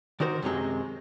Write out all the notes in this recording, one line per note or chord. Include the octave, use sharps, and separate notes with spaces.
D#3 D4 F#4 A#4 C5
F#2 C3 F#3 G#3